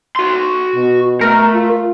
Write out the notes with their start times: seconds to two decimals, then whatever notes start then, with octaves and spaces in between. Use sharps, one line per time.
0.16 F#4 C6
0.75 B2
1.21 A3 A#4
1.54 F4